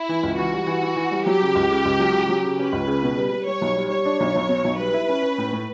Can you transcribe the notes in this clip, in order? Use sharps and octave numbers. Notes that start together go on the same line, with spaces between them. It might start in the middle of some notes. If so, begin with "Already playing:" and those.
Already playing: E4
E3
C#2
E3 F#4
G3
E3
E3
E3
G3
F#3 G4
C#3
C#2
C#3
C#2
F#3
C#3
F#3
C#3
C#4 B4
C#2
C#3
B2
G3
G3
G3 C#5
B1
G3
G3 C#5
D4
B1
B1
B2
B1
G3 B4
E4
C#4
C#4
A2
A2